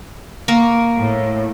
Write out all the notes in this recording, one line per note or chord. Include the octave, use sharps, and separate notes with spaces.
A#3 A#4 C#6
A2